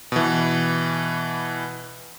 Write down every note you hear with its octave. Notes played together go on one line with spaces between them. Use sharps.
B2 E3